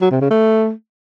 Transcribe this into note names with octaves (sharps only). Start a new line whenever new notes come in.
F#3
C3
C#3
A3